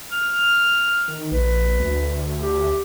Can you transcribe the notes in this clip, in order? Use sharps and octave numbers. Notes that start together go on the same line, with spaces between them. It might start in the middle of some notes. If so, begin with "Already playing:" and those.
F6
D#3
A#1 B4
D2
G4